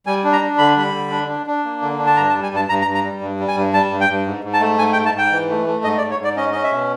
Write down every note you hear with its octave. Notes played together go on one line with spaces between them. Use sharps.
G3 G#5
D4
A#5
D4
D3 B5
G3 B5
D3
D4
D4
D4
A#3
D3
D4
A5
G2 A#5
A5
G3
G#5
G2 A5
G2 A#5
A#5
G2
A#5
G3
G2
G3
G#5
G2
G3 A5
G2
G5
G2
G#2
G#2
A5
A3
G#2 G#5
G5
G#2
A5
G#2 G5
E3
A3
A3
G#2 D#5
D5
G#2
C#5
G#2 D5
C#4 D#5
C#4 D#5
E5
B2